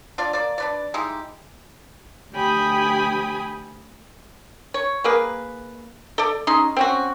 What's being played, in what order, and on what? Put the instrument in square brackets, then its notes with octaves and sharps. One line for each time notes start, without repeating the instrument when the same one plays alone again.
[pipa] D4 F4 D5
A#3 D5
D4 B4 D5
G#3 D#4 E4 G4
[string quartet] D2 G4 G5 G#5 B5 D#6
[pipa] C#5
A#3 G#4 B4
A4 D5
C#4 D#4 G#4 C6
C4 C#4 F#4